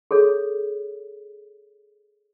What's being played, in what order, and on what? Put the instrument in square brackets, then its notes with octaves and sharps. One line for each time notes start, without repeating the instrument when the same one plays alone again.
[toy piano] G#4 A4 C#5